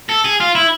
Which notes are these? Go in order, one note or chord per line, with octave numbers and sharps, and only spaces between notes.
A4
G#4
F4
E4